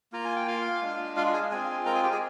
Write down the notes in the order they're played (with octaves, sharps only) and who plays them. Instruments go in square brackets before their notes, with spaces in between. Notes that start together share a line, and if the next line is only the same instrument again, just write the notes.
[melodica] A#3 F4 A#5
G#5
G5
F4 F5
G#3 D4 F4
F4 F5
G#4 G#5
G#3 C4 F4 G#4 G#5
A#4 A#5
G#4 G#5
G4 G5
G#4 G#5